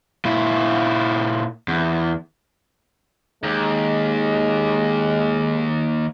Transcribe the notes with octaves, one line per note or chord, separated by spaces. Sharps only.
A#2 E4
E2
D#2 G#3